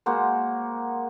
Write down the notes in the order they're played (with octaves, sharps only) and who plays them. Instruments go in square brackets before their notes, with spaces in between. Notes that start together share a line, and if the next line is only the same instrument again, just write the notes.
[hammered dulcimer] G#3 A#3 F#4 C5